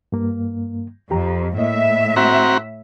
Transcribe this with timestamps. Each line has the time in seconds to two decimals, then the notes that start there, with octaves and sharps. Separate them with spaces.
0.12 G2 A#3
1.11 F2 G4 A#5
1.58 A2 A#3 D#5 E5
2.16 C4 F#4 A#5